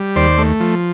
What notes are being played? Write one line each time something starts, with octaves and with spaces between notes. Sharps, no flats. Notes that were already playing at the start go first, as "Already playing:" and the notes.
Already playing: G3
D#2 C5 D5
A3
F3